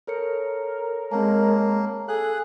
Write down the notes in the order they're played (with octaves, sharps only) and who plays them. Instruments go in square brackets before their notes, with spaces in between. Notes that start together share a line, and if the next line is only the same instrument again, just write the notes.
[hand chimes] A4 C#5 C#7 [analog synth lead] A#4
[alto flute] G#3 [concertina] A#3 [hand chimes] C4 C#5 A5
[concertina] G#4 [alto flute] A4 [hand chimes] F5 [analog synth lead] F#6